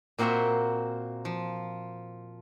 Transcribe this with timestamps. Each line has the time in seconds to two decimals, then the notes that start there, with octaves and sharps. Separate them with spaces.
0.18 A#2 A#3 C4 F#4 E5 C6
1.25 F3